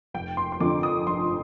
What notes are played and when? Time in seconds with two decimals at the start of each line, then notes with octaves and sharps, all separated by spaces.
0.14 F1 G5
0.37 C6
0.52 C6
0.60 F2 D3 F3 D6
0.83 D#6
1.07 F1 C6